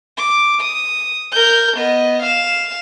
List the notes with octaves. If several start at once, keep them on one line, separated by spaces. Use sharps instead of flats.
D6
D#6
A#4 G6
B3 D#5
F5 E7